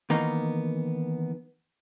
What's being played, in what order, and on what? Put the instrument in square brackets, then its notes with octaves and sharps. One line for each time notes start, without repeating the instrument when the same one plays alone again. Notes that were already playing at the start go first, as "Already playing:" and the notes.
[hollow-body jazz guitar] D#3 E3 A#3 B3 D#4